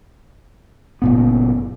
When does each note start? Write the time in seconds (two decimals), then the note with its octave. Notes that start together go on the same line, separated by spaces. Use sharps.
1.02 F#1 A#2 B3